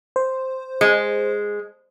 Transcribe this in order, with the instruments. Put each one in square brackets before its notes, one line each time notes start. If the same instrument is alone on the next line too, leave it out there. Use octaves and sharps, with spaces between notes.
[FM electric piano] C5
[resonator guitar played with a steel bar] G#3